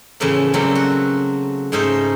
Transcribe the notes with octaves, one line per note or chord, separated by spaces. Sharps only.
A2 C#3 E3 F3 A3 A#3
C#3 F#3 G3 A3 A#3 C4
F#4
G#2 C#3 A3 C#4 D#4 C5